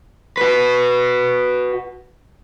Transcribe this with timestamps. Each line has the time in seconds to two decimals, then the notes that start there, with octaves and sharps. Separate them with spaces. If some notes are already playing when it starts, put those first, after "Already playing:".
0.37 F#4 B4